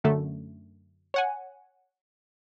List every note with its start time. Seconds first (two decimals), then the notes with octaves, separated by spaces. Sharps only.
0.04 F#2 D3 A3
1.14 C#5 F#5 G#5